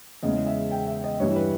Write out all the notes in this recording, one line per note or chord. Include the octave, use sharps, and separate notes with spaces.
E2 C#3 E3 G#3 D#5
E5
G5
E5
D#5
G2 E3 G3 C#5
B4